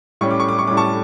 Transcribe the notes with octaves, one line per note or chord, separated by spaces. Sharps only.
A2 G3 C#4 C#6
D6
C#6
D6
C#6
A2 G3 C#4 D6
A5 C#6